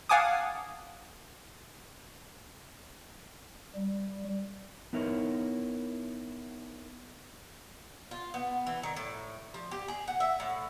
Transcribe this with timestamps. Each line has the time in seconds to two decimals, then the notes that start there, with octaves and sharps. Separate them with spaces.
0.09 F5 F#5 G#5 A5 D6 D#6
3.75 G3
4.93 B3 D#4 E4 A#4 C#5
8.11 F4
8.34 B3
8.67 E3
8.83 D#3
8.97 A2
9.54 F3
9.71 G4
9.88 G#4
10.08 F#5
10.20 E5
10.40 A2